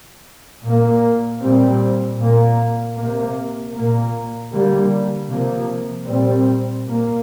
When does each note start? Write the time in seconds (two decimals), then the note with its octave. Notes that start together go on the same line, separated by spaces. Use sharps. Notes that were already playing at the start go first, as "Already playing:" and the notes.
0.63 A#2 A#3
1.41 A#2 G3 C4
2.18 A#2 A#3
2.97 C3 A#3
3.74 A#2 A#3
4.52 D3 G3 A#3
5.29 C3 F3 A#3
6.07 A#2 G3 C4
6.85 A#2 A#3